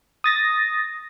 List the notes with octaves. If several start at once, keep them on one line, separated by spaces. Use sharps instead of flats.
D#6 A6 A#6